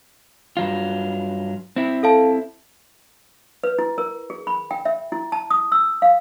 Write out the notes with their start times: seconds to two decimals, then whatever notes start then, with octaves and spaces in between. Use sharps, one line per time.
0.57 G2 F#3 F4
1.76 C4 E4
2.03 A4 F5 A5
3.64 B4
3.79 E4
3.98 A#4
4.30 G#4
4.47 B5
4.71 G5
4.85 E5
5.12 E4
5.32 A5
5.50 D#6
5.72 E6
6.02 F5